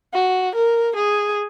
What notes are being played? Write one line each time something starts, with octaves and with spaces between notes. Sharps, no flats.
F#4
A#4
G#4